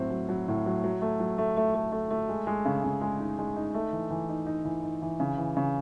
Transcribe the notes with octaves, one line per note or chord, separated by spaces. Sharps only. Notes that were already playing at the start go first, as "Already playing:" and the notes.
Already playing: A2 F#3 C4 E4
F#3
F#3
A2
F#3
F#3
A3
F#3
A3
A3
A3
A3
A3
G#3
G#3
C#3
C#3
G#3
D#4
G#3
D#4
A3
E3
E3
D#4
D#4
E3
D#4
E3
C#3
E3
C#3